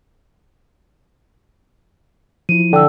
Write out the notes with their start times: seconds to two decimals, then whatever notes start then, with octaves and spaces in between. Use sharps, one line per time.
2.49 F3 E4 D#7
2.73 D3 G5 E6